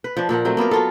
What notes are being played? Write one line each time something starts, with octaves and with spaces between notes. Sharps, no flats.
B4
F3 D4
A#2 F3 A#4 F#5
F#3 A3 C4
A#3 B3 F4 A#4
F#3 F4 A4